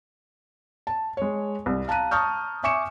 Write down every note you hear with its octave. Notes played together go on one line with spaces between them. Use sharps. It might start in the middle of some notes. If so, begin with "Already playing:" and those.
A5
G#3 C#5
C2
F5 A5 A#5 F#6 D#7
A5 A#5 C#6 D#6 F6 G6
E5 G#5 C#6 D6 C#7 E7